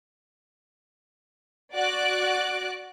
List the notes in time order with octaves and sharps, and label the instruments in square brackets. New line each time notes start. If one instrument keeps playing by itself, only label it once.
[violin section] F#4 D5 D6 F#6